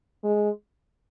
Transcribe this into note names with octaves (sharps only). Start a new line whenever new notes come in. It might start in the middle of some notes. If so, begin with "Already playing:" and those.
G#3